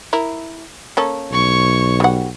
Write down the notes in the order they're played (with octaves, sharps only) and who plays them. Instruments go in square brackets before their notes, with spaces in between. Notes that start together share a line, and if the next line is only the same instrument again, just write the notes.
[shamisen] E4 A#4
A#3 C#4 A4
[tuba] B1 [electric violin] C#5 C#6
[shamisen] G3 F#5